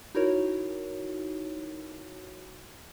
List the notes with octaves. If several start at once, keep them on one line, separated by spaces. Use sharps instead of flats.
D#4 E4 F#4 A#4 C#5